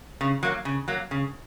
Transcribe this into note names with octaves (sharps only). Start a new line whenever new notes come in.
C#3
F#3 A#3
C#3
F#3 A#3
C#3